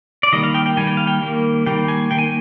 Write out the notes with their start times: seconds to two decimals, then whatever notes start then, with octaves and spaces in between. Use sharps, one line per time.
0.23 D5
0.33 D#3 G3 A#3 D#5
0.44 F5
0.54 G5
0.66 G5
0.77 D#3 G3 A#3 G#5
0.87 G5
0.97 F5
1.07 G5
1.22 D#3 G3 A#3
1.66 D#3 G3 A#3 G5
1.88 G#5
2.11 D#3 A#3 G5
2.19 G#5